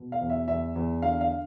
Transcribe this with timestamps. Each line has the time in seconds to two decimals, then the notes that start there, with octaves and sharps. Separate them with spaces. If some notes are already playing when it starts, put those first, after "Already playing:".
Already playing: B2
0.12 F5
0.21 E2
0.30 E5
0.48 E2 E5
0.76 E2
1.02 D3 F5
1.21 F5